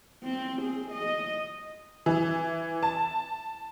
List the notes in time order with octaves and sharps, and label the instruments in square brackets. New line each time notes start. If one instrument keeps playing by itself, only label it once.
[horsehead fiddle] C4
G#4
D#5
[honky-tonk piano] E3
A5